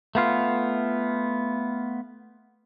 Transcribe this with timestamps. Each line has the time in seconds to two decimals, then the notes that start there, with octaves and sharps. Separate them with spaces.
0.15 A3 B3 F4